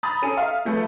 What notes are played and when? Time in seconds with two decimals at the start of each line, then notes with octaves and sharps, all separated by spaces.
0.03 A#5 B5 D#6 A6
0.22 C#4 A4 A#5 D#7
0.37 E5 F5
0.65 F3 A3 A4 B4